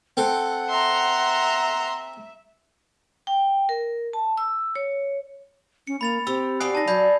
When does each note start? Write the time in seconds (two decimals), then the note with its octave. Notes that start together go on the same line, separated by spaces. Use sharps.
0.17 C4 A4 F#5
0.69 E5 A#5 C6
3.27 G5
3.69 A#4
4.13 A5
4.38 E6
4.76 C#5
5.87 C#4 C#7
6.01 A#3 B5 A6 F7
6.27 C4 G4 E6
6.61 F#4 G4 D5 G#5 D#6 C7
6.75 D#4 A5 A#6
6.88 F#3 D5 B5 G6 G#6